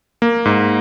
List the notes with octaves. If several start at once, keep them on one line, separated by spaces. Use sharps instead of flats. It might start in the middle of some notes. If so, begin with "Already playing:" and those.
A#3
G#2